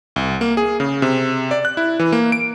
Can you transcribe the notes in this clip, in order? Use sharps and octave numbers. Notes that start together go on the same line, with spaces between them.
C2
A#3
G#4
C#3
C3
D5
F#6
E4
E3
A#3
D7